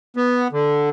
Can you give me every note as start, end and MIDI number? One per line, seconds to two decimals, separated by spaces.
0.17 0.48 59
0.52 0.90 50